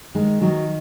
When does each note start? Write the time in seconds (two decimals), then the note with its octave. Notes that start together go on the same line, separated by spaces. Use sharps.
0.15 D#3 G#3
0.41 D#3 F#3